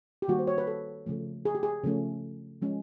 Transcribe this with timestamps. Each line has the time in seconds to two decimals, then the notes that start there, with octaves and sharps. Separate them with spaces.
0.22 G4
0.28 D#3 G3 A#3 F#4
0.39 C5
0.47 C#5
0.58 B4
0.67 A4
1.06 C#3 F3 A3
1.45 G#4
1.55 G4
1.63 G#4
1.84 C#3 F3 A3 C#4
2.62 F3 G#3 C#4